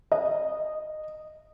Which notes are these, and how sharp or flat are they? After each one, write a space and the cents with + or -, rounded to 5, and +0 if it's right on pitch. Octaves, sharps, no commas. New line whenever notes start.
D#5 -15